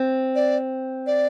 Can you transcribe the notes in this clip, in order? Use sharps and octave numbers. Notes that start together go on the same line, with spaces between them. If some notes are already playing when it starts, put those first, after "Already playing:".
Already playing: C4
D5
D5